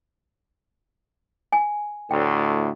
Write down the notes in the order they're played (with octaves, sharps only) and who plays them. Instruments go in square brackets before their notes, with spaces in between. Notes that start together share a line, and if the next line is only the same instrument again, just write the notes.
[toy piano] G#5
[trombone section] D2 A2 [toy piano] G5